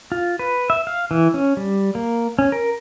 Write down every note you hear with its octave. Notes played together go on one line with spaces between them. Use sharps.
F4
B4
E5
F5
E3
C#4
G3
A#3
C#4
A#4